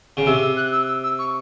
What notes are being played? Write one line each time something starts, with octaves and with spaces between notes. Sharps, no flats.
C#3
C3 E6
E6
F#6
E6
E6
E6
C#6